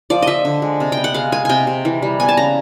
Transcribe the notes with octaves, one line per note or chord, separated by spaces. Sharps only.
F3 D5
F3 D#5 E5
D3
G#3
C3
G5
B3
F#5
G#3 F5
G#3 G#5
C3 G5 G#5
C3
E3
G3
B3 G#5
A5
C#3 A#5